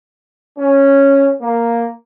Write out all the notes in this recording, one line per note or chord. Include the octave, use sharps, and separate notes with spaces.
C#4
A#3